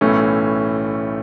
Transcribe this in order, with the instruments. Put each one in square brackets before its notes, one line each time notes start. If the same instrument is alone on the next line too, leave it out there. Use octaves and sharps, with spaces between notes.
[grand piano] B1 A2 E3 A3 C#4